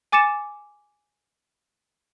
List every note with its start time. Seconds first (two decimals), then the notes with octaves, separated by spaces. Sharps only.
0.12 G#5 D6 A6 C#7 E7